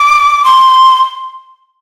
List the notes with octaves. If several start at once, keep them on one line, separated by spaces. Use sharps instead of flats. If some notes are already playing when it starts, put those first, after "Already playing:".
Already playing: D6
C6